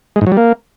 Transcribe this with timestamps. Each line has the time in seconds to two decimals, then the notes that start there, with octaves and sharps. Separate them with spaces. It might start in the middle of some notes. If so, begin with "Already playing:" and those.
0.16 G#3
0.21 G#2
0.27 F#3
0.32 G3
0.37 A#3